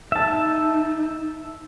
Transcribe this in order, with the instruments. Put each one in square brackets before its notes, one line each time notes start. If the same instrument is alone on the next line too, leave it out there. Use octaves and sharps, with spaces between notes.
[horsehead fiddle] D#4 [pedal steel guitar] E5 A5